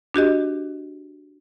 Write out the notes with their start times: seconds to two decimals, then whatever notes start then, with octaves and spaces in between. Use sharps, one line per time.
0.14 D4 F#4 G4 D#5